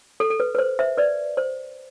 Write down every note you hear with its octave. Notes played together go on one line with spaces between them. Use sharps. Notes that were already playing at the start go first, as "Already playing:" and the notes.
A4
A4
B4
B4
C5
C5 E5
B4 D5
C5